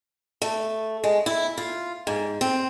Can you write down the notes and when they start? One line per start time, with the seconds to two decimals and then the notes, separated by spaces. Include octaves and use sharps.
0.42 A3
1.04 G#3
1.26 E4
1.58 F4
2.07 G#2
2.41 C4